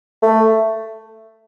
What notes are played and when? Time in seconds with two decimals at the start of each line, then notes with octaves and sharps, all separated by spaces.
0.23 A3